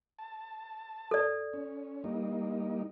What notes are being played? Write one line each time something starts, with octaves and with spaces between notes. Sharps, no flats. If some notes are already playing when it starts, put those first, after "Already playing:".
A5
A4 D5
C#4
G3 A#3 D#4